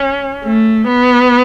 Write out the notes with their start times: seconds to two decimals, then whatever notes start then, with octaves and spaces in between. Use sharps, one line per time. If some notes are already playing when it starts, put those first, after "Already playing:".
Already playing: C#4
0.44 A3
0.87 B3